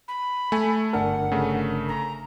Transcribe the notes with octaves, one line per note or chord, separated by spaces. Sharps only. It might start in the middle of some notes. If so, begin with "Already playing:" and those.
B5
A3 G#5
G1 D4 A#4 F#5
C#3 A3
A#5